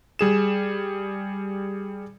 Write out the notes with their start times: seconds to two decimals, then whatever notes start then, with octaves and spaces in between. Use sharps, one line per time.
0.19 G3 G#4 E7